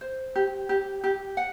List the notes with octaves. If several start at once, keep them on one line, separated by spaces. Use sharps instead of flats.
C5
G4
G4
G4
F#5